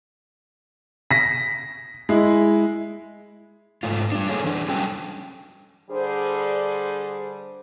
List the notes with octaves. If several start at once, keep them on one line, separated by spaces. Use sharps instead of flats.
A#6 B6
G#3 E4
G#2 A3 F4
G3 D4
A#3 D4 G#4 A4 C#5
E3 D4
F#3 G3 C#4 A4 G5
D3 G3 D4 G#4 C5